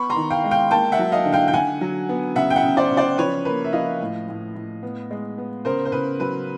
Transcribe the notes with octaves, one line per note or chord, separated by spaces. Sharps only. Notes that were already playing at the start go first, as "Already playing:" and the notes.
Already playing: B3 B5 C#6
A#5 C6
D#3
F5 G5
G#3
F5 G5
A#3 G5 A5
E5 F#5
F#3
D#5 F5
D3
F5 G5
G5
D3 F#5 G#5
F#3
B3
C#3 E5 F#5
G5
E5 F#5
C#3
C5 D5
C#3
C5 D5
F3 B4 C#5
A#3 B4
E5
F3 D#5 F5
A2
A2
A2
B3
G#3
B3
C#3 A#4 C5
C5
C#3 B4
F#3 B4